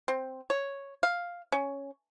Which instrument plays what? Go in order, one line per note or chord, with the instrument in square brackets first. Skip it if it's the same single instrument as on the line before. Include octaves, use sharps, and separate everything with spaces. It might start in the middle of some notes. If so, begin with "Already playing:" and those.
[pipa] C4
C#5
F5
C#4